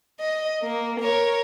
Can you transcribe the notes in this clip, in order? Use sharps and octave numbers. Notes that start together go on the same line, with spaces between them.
D#5
A#3
A#4 C#5